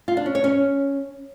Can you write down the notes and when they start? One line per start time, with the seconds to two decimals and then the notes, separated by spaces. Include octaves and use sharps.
0.08 F4
0.17 D4
0.26 C#4
0.35 C#5
0.44 C#4